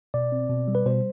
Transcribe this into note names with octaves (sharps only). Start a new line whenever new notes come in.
B2 D5
C4
B2
G3
B4
B2 C5